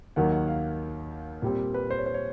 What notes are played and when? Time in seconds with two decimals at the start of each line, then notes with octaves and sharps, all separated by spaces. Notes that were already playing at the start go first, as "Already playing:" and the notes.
0.16 D#2 D#3 F#3 A#3 F#5
0.32 F#5
0.48 F5
1.42 A#2 G3 C4
1.74 B4
1.91 C5
1.98 C#5
2.06 C5
2.14 C#5